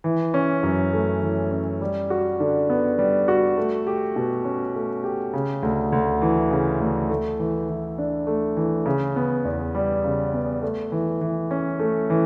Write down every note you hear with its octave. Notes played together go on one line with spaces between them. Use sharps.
E3
C#4
F#2
A3
E3
C#4
G3
F#4
D3
B3
G3
F#4
A3
G4
B2
C#4
A3
G4
C#3
D2
D2
E3
C#3
D2
A3
E3
E3
D4
A3
E3
C#3
B3
E2
G3
C#3
B3
A3
E3
E3
C#4
A3
E3